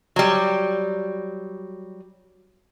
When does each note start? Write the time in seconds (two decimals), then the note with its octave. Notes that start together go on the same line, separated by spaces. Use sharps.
0.16 F#3 G3